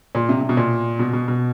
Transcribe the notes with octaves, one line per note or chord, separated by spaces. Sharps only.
A#2
C3
C3
B2
A#2
B2
B2
B2